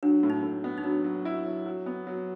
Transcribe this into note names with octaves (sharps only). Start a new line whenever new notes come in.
F#3 D4
A2
D#4
A2
B3
D#4
F#3 D4
F#3
E4
F#3
F#3
B3
F#3